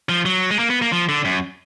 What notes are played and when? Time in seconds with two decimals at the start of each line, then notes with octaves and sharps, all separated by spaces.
0.09 F3
0.26 F#3
0.51 G#3
0.59 A#3
0.70 B3
0.82 A#3
0.92 F3
1.09 D3
1.25 F#2